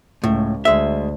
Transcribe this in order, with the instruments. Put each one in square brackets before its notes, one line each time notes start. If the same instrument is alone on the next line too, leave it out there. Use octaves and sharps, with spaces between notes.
[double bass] C#2 [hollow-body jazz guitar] A2
[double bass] D2 [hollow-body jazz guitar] G#3 E5